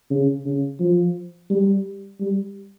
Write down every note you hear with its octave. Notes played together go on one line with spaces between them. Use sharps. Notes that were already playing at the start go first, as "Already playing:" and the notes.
C#3
C#3
F3
G3
G3